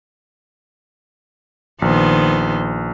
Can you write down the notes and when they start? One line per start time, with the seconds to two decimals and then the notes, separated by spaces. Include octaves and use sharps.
1.82 A#1 D#3 B3 C5